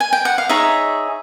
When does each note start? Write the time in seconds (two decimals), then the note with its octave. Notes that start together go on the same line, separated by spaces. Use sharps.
0.00 G#5
0.13 G5
0.25 F#5
0.38 F5
0.49 D#4 G#4 C#5 E5